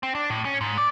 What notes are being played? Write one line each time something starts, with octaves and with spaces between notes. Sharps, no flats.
C4
D4
A2
C#4
G#2
D5